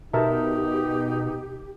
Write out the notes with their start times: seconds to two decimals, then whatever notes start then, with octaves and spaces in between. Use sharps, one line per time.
0.13 B2 D#4 G4 A#4 E5 A5